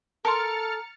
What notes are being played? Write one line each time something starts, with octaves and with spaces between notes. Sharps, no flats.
A4 A#4 A5 C6 F6 A6 C#7